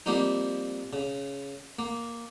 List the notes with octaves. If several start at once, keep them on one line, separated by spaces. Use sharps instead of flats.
F3 G3 A#3 C4 D#4
C#3
A#3